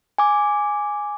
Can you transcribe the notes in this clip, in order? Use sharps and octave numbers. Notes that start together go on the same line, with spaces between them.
G#5 D6